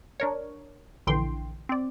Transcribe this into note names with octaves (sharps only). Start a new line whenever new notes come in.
D4 A#4 C#5
A#1 D3 E3 G5 C6
C4 D5